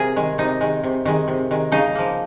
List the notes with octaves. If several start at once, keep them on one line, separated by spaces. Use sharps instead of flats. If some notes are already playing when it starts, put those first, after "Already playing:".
Already playing: C3 G#4 A#4
D#3 G#3
C3 D#4
D#3 G#3
C3
D#3 G#3
C3
D#3 G#3
C#3 D#4
F3 A#3